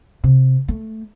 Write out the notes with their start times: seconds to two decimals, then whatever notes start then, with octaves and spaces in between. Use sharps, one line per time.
0.24 C3
0.68 A3